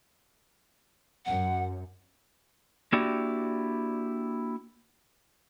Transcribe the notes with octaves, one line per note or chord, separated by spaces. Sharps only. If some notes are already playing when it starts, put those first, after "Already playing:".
F#2 F#5
A#3 D4 E4 F#4 G4 D5